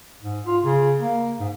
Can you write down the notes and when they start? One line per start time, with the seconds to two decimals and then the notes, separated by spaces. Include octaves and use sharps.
0.22 G#2
0.47 F4
0.64 C#3
0.99 A#3
1.40 G#2